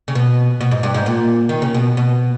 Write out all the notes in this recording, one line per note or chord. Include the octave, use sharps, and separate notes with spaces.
C#3
B2
B2
G#2
G2
G#2
A#2
D#3
C#3
B2
B2